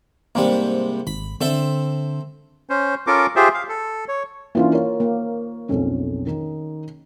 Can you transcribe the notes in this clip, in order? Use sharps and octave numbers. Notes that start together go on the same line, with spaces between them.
G#2 C3 G3 A#3
G#1 B5
D3 C4 A4 E5
C#4 C5
C#4 F4 A4 A#4 D6
F4 G4 G#4 C5 E5
F5
A4
C#5
E3 A#3 C#4 D4 F4
A#4 C#5
A#3
B1 F2 C#4
D#3 D#4